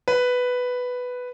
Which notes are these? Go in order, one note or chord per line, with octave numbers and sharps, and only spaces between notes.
B4